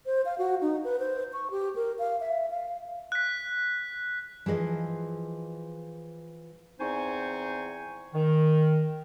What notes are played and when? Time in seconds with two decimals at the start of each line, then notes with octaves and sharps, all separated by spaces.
0.06 C5
0.25 F5
0.38 F#4
0.61 D#4
0.84 B4
0.99 C5
1.33 C#6
1.51 G4
1.75 A#4
1.99 F5
2.20 E5
2.50 F5
3.12 F#6 B6
4.46 E3 F3 G#4 D#5
6.80 E2 C4 D#4 C5 G#5 C#6
8.14 D#3